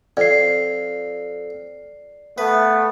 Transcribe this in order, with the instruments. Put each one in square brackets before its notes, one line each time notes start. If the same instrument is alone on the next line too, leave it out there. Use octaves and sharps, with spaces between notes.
[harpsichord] F2 [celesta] D5 C7
[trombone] A3 [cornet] B3 [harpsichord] B4